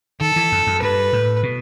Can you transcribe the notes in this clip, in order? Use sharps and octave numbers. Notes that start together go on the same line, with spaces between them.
D#3 A4
E3
F#2
F#2
G2 B4
A2
B2